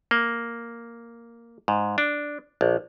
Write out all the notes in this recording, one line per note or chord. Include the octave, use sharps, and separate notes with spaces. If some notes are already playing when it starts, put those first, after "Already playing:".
A#3
G#2
D4
A#1